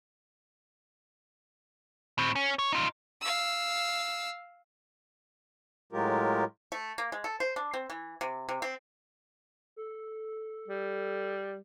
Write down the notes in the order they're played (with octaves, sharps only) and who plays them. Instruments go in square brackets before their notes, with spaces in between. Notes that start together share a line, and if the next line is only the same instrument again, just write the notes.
[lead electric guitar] A2 C4
C#4
C#5
D#4 F4
[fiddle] F5 E6
[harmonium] A2 F#3 G#3 F4 G4 A#4
[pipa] A3
A#3
G#3
A4
C5
D4
C4
E3
C3
C3
C4
[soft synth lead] A4
[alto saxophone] G3